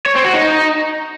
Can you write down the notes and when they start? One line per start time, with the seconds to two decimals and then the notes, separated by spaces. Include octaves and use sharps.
0.06 C#5
0.15 C4
0.25 F#4
0.34 D#4